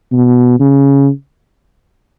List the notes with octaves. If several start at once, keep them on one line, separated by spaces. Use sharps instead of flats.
B2
C#3